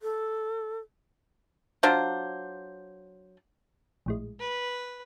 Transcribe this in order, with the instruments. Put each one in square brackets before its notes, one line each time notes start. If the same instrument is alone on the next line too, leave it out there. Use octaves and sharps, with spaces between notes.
[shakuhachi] A4
[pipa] F#3 D4 F4 C5
[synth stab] A#1 A2 G#3
[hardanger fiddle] B4